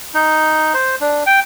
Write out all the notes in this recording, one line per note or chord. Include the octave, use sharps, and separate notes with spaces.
D#4
C5
D4
G5